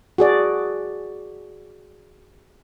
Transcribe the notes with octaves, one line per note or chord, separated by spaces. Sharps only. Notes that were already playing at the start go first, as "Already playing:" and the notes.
F#4 G#4 D5